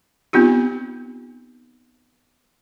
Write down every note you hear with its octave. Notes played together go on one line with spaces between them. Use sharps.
B3 C4 D#4 F4 G4